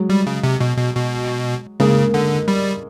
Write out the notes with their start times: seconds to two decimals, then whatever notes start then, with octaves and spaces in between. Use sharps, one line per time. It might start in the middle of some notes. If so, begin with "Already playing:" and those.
Already playing: F#3 G#3
0.10 G3
0.27 C#3
0.44 C3
0.60 B2
0.78 B2
0.95 B2
1.80 C#3 G#3 A#3
2.14 D3
2.48 G3